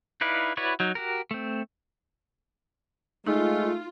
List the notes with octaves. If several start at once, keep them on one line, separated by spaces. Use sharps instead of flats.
D#4 E4 B4 D5 F5
E4 F#4 B4 C#5 D5
F#3 D#4
F#4 G4 A#4
A3 C4
G#3 A3 D#4 F4